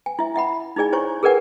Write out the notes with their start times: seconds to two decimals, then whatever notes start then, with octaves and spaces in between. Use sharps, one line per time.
0.06 G#5
0.19 E4 E5
0.34 E4 E5 F#5 B5
0.76 D#4 E4 G#4 D5 G#5
0.93 E4 C5 C#5 G#5 C#6
1.23 G#4 A#4 B4 D5 F#5 G#5